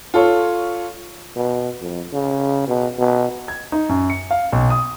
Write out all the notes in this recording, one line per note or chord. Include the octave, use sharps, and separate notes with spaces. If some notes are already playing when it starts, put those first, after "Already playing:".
F4 A4 C#5
B2
F2
C#3
B2
B2
G#6
D#4
F#2
C#7
F5
B1
D#6